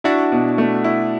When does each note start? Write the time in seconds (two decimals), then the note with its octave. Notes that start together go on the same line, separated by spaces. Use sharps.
0.04 D4 E4 F#4
0.32 B2
0.58 A3
0.84 E4